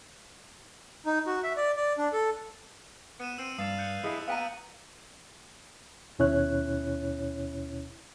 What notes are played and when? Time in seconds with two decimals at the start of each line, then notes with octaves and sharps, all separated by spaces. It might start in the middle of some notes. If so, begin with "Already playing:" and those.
1.06 D#4
1.27 F#4
1.44 E5
1.56 D5
1.77 D5
1.98 D4
2.13 A4
3.20 B3 C#7 D#7 E7
3.38 C4 E6 D#7
3.58 G2 F5 D#6 A6 E7
3.78 F#6 G6 C#7
4.04 E4 G#4 D#5
4.28 B3 F5 G5 A#5 E6 B6 D#7
6.19 D#2 B2 C#4 E4 C#5 F#6